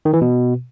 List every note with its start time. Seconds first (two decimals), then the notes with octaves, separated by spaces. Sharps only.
0.05 D#3
0.13 E3
0.21 B2